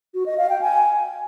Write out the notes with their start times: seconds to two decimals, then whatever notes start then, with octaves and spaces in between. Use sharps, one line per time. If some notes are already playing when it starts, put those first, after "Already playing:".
0.14 F#4
0.26 D#5
0.38 F5
0.50 G5
0.61 G#5